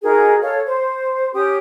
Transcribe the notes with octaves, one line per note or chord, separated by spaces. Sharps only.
D#4 F#4 G#4 A#4
A4 C#5 F5
C5
C#4 G4 D#6